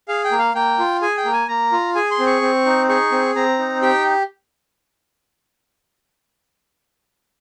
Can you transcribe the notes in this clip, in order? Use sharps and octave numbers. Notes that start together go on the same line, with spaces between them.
G#4 F5
G5
A#3
F5
A#3 G5
F4
G#4 G#5
G5
A#3
G#5
A#3 A#5
F4
G#4 G#5
C6
C4
C#6
C4
D#4
G#4 C#6
C4
C4 A#5
D#4
G4 G5